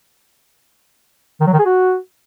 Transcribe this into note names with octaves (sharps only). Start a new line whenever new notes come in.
D#3
F#3
D#3
G#4
F#4